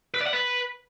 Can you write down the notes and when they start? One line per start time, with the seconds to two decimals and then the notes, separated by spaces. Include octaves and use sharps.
0.14 B4
0.21 D5
0.27 F#5
0.33 B4